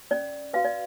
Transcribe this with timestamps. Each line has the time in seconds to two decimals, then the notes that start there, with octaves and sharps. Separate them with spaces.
0.11 C#4 D5
0.53 F#4 B4 F5
0.65 D5